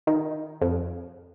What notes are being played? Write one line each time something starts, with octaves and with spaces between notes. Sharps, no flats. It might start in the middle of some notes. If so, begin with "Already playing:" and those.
D#3
F2